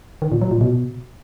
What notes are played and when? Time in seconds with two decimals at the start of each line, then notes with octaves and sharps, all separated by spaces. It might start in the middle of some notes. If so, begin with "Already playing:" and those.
0.22 D#3
0.32 A#2
0.41 F#3
0.51 A#2
0.61 B2